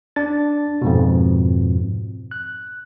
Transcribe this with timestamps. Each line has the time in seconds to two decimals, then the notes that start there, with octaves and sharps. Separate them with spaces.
0.16 D4 A6
0.82 F2 G#2 B2
2.31 F#6